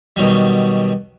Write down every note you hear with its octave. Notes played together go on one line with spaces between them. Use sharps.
B2 D#3 F#3 G3